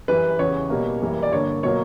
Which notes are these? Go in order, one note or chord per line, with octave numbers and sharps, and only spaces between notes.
F#2 E3 G3 B4
E2 C#3 G3 C#5
B2 G3 A#3
F#2 E3 G3 A#3
D5
G2 D3 A#3 C#5
B2 F#3 A#3 C#5